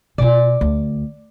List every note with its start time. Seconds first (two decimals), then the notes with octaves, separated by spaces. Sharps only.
0.18 B2 F4 D5
0.61 D2